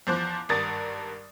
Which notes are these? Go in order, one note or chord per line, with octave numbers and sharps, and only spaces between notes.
E2 F3 C5 D6 F#6
G#1 G2 A#4 D#6 A6